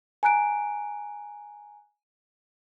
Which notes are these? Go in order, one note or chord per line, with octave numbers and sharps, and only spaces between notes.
G#5 A#5 F#6 D7